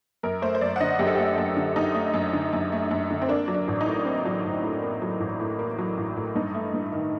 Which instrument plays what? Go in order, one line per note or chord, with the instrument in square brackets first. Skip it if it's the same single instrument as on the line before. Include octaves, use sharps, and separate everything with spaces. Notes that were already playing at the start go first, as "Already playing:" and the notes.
[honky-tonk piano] F#2 A#4
A3 C5
C5
F#2 D5
F#5
D3 D#5
F#2 G4
A4
A3 G4
F#2
D3
F#2 D#4
A3
F#2
D3
F#2
A3
F#2
D3
C4
A#3 D4
F#3
D4
A1
D#4
A2
A#3 C4
F#3
A1
A2
A#3
F#3
A1
A2
A#3
F#3
A1
A2
G2 D#4
A3
G2
D#3